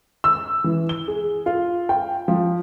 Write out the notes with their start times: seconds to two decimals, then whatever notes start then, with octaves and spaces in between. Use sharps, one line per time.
0.24 E6
0.64 E3
0.89 G7
1.08 G#4
1.46 F4
1.89 G5
2.28 F3